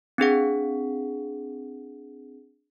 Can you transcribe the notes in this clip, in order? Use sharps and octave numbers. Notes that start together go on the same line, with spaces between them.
C4 D4 G#4 F#5